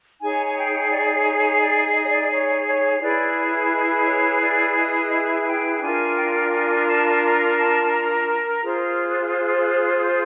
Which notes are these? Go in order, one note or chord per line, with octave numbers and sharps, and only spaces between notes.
D#4 G#4 C#5 G#5
G#5
G5
D5
C#5
C#5
D5
D#5
C#5
D5
C#5
C#5
E4 G#4 B4 D5
D#5
C#5
D5
D#5
E5
G5
D4 F4 A#4 G#5
G5
G#5
A5
A#5
A5
A#5
A#5
F4 G#4 C5
F6
F#6
F#6
G6